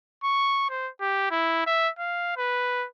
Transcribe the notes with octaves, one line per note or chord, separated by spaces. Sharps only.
C#6
C5
G4
E4
E5
F5
B4